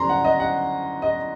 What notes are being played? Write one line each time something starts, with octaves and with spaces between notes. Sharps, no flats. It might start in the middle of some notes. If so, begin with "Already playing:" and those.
Already playing: F#2 D3 G3 D4 A#5 C6
F#5
D#5
F#5
D#5